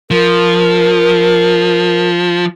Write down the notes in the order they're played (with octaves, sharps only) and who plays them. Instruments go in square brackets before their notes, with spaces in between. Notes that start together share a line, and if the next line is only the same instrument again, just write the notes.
[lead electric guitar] F3 [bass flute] A#4